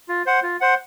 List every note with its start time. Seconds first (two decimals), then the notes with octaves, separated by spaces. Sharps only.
0.09 F4
0.26 C5 F#5
0.43 F4
0.61 C5 F#5